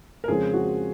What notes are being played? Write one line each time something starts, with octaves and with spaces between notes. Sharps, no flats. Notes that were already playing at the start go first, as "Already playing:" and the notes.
A#4
F2 C#3 G#3 C4 G#4
F#4